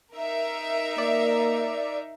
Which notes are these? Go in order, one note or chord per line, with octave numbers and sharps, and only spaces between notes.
D#4 A#4 E5
A#3 D5